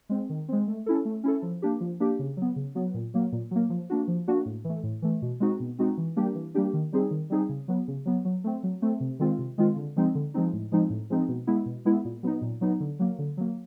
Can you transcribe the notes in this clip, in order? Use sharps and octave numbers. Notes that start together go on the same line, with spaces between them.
G#3 C4
D#3
G#3 C4
A3
C#4 E4 A4
A3
C#4 E4 A4
F3
A#3 D4 G4
F3
A#3 D4 G4
C#3
F#3 B3
C#3
F#3 B3
A#2
F#3 A#3
A#2
F#3 A#3
F3
A#3 D4 F#4
F3
A#3 D4 F#4
A2
E3 A3
A2
E3 A3
B2
G#3 C4 D#4 F#4
B2
G#3 C4 D#4 F#4
E3
G3 A#3 D4 G4
E3
G3 A#3 D4 G4
D#3
G3 C4 D#4 G#4
D#3
G3 C4 D#4 G#4
C#3
F#3 B3
C#3
F#3 B3
F#3
A3 C4
F#3
A3 C4
C3
D#3 G#3 C4 F4
C3
D#3 G#3 C4 F4
D3
F3 G#3 C4 D#4
D3
F3 G#3 C4 D#4
A2
F3 G#3 C4 D#4
A2
F3 G#3 C4 D#4
B2
G#3 B3 E4
B2
G#3 B3 E4
A#2
F#3 B3 D#4
A#2
F#3 B3 D#4
D3
F#3 A#3
D3
F#3 A#3